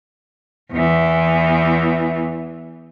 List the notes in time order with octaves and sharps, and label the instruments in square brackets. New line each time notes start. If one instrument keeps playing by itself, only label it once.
[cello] E2 E3